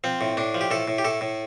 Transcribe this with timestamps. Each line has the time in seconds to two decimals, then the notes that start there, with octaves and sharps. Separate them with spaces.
0.04 F3 C4
0.21 A2
0.37 A2 D4
0.55 F3
0.61 G4
0.71 A2 A4
0.88 A2
0.98 G4
1.04 A2 A4
1.21 A2